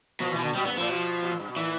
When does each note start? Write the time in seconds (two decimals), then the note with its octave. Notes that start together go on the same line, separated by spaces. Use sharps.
0.20 B2 F3
0.32 E3
0.37 B2
0.43 D3
0.55 B2 G3
0.63 A2
0.66 B3
0.71 G2
0.77 A2 F3
0.89 B2
1.23 B2
1.31 A2
1.40 G2
1.48 B2
1.56 A2 E3